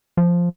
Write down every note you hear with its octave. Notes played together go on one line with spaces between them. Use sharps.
F3